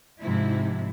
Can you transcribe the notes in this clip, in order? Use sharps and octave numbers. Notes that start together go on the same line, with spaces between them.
G#2 C3 F3 E4